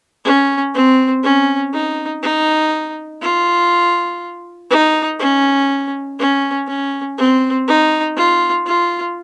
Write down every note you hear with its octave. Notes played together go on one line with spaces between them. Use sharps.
C#4
C4
C#4
D#4
D#4
F4
D#4
C#4
C#4
C#4
C4
D#4
F4
F4